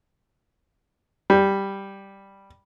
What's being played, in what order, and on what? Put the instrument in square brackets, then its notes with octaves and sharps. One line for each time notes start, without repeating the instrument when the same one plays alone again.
[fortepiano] G3